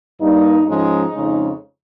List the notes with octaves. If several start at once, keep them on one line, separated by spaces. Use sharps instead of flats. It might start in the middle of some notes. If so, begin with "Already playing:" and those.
G2 G3 A#3 D#4
G#2 F3 G#3 C#4 D#4
F2 C#3 G#3